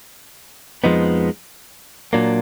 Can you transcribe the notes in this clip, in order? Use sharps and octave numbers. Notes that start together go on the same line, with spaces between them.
F2 F3 G#3 B3 D#4
A#2 F#3 A#3 D4